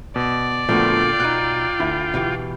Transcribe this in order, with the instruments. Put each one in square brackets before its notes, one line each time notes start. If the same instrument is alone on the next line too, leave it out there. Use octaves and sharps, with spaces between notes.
[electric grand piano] B2 [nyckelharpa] D5
[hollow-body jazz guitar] A#2 D3 F#4 [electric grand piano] F3 A3 B3 [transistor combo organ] F4 G5
[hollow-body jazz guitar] B2 D#4 [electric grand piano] F#6
[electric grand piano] D2 [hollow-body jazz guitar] E4
[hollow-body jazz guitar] B2 E3 G4